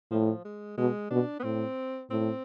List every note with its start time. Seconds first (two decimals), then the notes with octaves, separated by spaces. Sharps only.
0.11 A2 F3
0.45 G#3
0.78 B2 G#3
1.11 B2 D4
1.39 B3
1.44 A2 C4
2.11 A2 C4